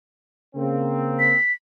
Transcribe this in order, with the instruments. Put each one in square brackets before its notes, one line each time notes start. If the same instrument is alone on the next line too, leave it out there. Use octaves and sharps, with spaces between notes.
[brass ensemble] C#3 A#3 C4
[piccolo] B6